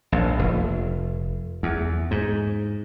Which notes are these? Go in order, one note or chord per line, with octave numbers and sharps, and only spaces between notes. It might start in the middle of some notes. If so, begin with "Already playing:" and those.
A#1
F1
E2
G#2